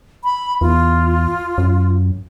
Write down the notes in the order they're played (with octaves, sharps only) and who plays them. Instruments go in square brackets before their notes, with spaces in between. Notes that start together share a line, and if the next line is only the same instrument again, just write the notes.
[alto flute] B5
[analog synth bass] E2 [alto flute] F4
[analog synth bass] F#2